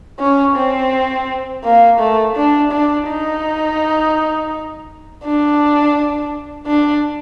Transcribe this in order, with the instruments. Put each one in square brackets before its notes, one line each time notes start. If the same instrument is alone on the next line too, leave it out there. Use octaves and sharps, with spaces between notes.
[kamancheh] C#4
C4
A#3
A3
D4
D4
D#4
D4
D4